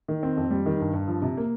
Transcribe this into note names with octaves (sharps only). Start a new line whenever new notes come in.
D#3
C4
F2
G3
D#3
G2
G2
F3
C3
A#3